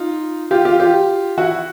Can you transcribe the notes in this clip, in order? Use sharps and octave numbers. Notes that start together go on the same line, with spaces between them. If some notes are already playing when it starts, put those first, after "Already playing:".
Already playing: D#4 F4
F4 G4
F4 G4
F4 G4
E4 F#4